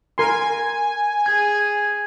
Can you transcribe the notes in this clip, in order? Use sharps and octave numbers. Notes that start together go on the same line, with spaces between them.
A#4 G#5 C6
G#4 G#6